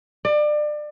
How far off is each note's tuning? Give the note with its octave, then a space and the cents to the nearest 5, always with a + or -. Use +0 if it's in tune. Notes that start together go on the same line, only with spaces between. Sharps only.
D5 +30